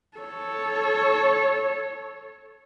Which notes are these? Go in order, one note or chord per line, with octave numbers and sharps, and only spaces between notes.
A4 C#5